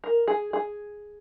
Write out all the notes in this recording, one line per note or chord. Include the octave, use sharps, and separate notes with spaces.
A#4
G#4
G#4